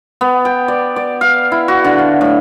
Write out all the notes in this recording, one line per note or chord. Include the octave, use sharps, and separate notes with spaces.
B3
G5
D5
D5
F5
E4
F#4
D3
F5
A2